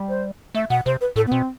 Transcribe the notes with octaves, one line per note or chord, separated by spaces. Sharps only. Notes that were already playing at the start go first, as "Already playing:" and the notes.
Already playing: G3
C5
A3 E5
B2 F#5
C3 C5
B4
A2 A4
B3
B2 C4